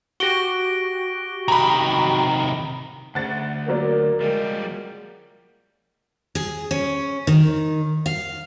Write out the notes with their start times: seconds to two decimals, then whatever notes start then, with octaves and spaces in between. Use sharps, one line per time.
0.20 F#4 G4 A#6 D7 G7
1.48 C3 D#3 A#5 B5
3.15 D2 F#5 A6
3.68 F#3 A#3 A#4 D5
4.21 F3 G3 G#3
6.35 G#4
6.71 C#4
7.27 D#3
8.06 F5